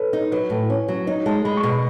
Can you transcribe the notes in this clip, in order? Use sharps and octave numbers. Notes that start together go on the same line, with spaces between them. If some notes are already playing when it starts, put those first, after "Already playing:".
Already playing: A4 B4 C#5
D#4
F#3 B4
A2
C#4
F#3
D#4 C#5
G#3 A5
G#3 B5
C#6
B2
B5